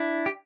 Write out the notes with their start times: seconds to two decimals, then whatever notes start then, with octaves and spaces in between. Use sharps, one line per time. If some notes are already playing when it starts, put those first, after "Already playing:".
Already playing: D4 E4
0.26 G4